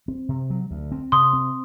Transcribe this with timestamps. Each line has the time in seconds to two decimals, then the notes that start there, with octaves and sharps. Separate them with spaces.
0.08 C4
0.29 C3
0.50 F#3
0.71 D2
0.92 C4
1.12 C3 C6 D#6
1.33 C4